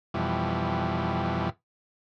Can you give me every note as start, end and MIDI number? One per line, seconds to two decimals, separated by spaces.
0.14 1.50 41
0.14 1.50 47
0.14 1.50 52
0.14 1.50 55